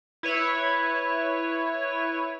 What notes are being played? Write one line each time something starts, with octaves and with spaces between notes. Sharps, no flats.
E4 B4 C#5